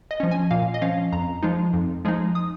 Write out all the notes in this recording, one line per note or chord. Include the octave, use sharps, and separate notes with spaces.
D#5
F3 C#4
G#5
A#2 F5
D#5
F3 C#4 F5
F2 A#5
F3 G#3 D#4
F2
F3 G#3 D#4
D#6